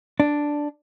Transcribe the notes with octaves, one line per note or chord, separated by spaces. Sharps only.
D4